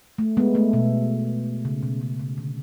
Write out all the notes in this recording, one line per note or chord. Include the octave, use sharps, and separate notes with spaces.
A3
G#3 B3
A3
B2
C#3
B2
C#3
C#3
D3